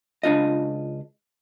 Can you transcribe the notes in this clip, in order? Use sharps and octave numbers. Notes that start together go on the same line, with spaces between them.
C#2 D4 F4 D#5